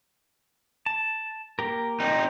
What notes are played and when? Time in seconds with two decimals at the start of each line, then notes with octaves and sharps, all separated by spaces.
0.86 A5
1.59 A#3 G4 A#4
2.00 C4 D#4